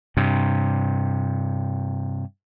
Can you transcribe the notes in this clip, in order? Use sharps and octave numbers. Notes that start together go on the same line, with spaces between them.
G2 C3